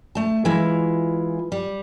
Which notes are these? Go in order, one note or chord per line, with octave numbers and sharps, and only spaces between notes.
A3 A5
E3 G#3 E4 F4
G3